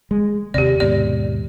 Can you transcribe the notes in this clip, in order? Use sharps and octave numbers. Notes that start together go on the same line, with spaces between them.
G#3
D#2 C3 G4 D5
D#2 G#2 B2 D5